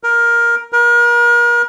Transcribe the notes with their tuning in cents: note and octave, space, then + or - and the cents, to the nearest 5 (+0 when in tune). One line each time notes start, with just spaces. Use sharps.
A#4 +15
A#4 +40